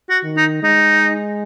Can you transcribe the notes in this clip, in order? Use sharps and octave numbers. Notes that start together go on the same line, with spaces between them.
F#4
D#3
D#4
G#3 D#4